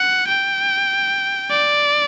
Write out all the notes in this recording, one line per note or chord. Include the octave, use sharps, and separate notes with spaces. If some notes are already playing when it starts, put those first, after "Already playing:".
Already playing: F#5
G5
D5